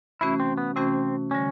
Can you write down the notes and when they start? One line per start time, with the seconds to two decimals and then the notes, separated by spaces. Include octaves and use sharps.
0.21 C3 E3 A3 C#4 E4 F#4
0.40 C4
0.58 B3
0.75 C3 E3 A3 C4 C#4 F#4
1.31 D3 G3 C#4